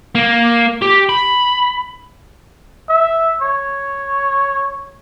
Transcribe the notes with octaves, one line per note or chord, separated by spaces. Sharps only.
A#3
G4
B5
E5
C#5